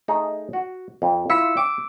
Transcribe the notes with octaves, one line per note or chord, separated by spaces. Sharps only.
A3 D#4 G#4
F#4
F2
E4 F4 E6 B6 C#7
G5 D6